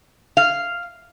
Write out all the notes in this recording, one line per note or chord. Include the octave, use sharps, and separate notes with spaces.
F5